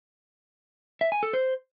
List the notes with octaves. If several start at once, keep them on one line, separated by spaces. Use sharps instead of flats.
E5
G#5
A4
C5